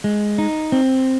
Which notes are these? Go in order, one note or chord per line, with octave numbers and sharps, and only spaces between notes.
G#3
D#4
C4